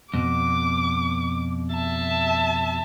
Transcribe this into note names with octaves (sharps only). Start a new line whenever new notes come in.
F2 B2 D6
E5 A5